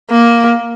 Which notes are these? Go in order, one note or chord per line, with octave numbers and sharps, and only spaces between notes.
A#3